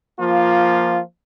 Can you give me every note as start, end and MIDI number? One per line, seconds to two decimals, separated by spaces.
0.19 1.01 53
0.19 1.01 58
0.19 1.01 65